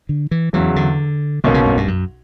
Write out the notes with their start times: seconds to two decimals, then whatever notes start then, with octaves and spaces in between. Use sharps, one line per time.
0.09 D3
0.31 E3
0.53 E2 C#3 E3 F#3
0.76 D3
1.44 B1 B2 D3 A#3 C#4
1.54 C#3
1.65 G2
1.77 G2
1.88 F#2